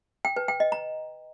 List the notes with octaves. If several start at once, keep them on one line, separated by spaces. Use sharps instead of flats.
G5
B4
G5
D#5
A#5